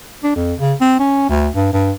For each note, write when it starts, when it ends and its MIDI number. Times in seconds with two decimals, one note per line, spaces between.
0.23 0.31 62
0.36 0.54 41
0.59 0.74 49
0.81 0.97 60
1.00 1.26 61
1.29 1.48 38
1.55 1.72 43
1.73 1.91 43